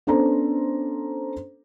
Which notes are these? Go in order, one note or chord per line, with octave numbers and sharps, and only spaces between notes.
B3 C#4 D4 A4 C5 A#5